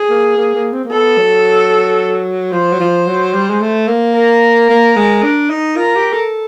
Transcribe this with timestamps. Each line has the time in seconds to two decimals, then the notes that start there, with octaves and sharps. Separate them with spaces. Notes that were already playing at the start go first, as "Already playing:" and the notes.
Already playing: G#4
0.10 A#3
0.37 A#3
0.55 A#3
0.73 C4
0.85 A#3
0.91 B3 A4
1.18 F#3
2.53 F3 C5
2.72 F#3
2.80 F3
3.07 F#3
3.34 G3
3.50 G#3
3.61 A3
3.88 A#3
4.15 A#4
4.70 A#3
4.96 G#3
5.23 D4
5.50 D#4
5.77 F4 A#4
5.96 G4
6.13 A4